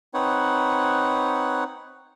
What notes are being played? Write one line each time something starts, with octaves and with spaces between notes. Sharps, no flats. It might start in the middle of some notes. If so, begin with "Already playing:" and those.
C4 D#4 B4 C#5 F#5